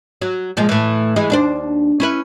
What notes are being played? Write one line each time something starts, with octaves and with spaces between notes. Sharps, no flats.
F#3
A#2 F3 G#3
A2 E3
E3 G#3
D#2 D4 C5
C#4 E4 B4